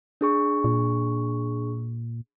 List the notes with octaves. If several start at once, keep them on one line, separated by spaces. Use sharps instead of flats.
D4 G#4 C#6
A#2